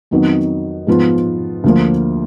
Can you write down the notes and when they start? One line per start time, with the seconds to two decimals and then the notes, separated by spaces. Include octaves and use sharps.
0.11 F2 D#3 F#3 B3 D#4
0.87 G#2 F3 B3 F4
1.64 D2 D3 F3 A#3